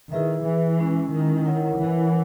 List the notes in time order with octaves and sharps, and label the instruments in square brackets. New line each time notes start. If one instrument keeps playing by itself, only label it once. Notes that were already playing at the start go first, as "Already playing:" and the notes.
[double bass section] D#3 [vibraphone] E4 G#4 B4 E5
[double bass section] E3
[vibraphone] G#3 C#4 E4
[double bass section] D#3
[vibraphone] E4 A#4 C#5 F#5
[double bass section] E3